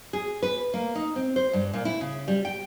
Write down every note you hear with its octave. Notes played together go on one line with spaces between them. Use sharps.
G#4
B4
A#3
D#4
C4
C5
G2
A#2
E4
C#3
G3
G5